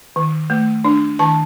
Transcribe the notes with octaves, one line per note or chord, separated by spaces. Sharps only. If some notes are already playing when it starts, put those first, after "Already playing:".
D#3
A3
D4
D#3 A5